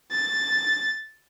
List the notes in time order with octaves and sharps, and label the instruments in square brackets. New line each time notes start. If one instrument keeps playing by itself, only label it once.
[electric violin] A6